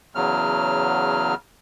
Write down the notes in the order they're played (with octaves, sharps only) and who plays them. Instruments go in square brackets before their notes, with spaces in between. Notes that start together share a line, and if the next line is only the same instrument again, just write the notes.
[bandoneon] E2 C#3 F#3 F6